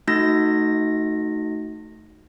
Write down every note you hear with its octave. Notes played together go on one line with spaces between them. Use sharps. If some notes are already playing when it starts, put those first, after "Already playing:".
A3 D#4 F#4 A#6